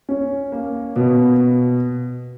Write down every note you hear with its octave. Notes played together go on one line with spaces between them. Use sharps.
C#4
A#3
B2